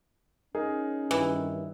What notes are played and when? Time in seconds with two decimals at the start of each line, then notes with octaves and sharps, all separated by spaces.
0.55 C#4 D#4 G#4 A#4
1.11 G2 D#3 E3